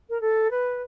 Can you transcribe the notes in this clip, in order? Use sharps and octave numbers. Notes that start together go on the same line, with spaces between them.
A#4
A4
B4